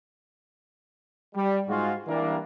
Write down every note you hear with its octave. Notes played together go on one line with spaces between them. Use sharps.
G3
G#2 F4 F#4 G#4
E3 G3 A#3 D4